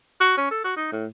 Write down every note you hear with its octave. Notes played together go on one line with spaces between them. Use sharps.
F#4
C#4
A4
F#4
D#4
A2